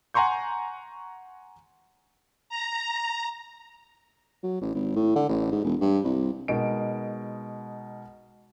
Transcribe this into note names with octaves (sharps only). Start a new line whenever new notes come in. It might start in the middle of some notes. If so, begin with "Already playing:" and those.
F#5 G#5 A#5 C6 C#6 G6
A#5
F#3
A1
G#1
A2
D3
A1
G#2
E1
G2
C2
B2 G#3 D#4 A#4 D7